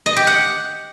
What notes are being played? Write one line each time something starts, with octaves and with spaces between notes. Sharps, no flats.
D#5
G4
F#5